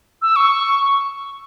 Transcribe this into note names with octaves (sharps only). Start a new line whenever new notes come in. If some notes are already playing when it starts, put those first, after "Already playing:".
E6
C#6